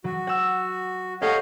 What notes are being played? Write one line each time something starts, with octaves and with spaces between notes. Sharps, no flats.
F#3 F#4
F#5 E6
G4 A4 C#5 D#5 F5 F#5